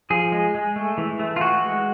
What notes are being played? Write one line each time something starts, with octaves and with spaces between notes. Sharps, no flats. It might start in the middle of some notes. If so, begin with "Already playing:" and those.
F3 G#4
G#3
G#3
A3
E3
A3
F4
E3 F#4
G#3